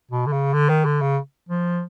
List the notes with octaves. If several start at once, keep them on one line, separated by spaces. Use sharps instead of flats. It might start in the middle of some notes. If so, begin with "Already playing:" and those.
B2
D3
C#3
D3
D#3
D3
C#3
F3